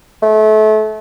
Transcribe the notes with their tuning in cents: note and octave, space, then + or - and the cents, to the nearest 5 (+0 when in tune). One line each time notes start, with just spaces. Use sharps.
A3 -30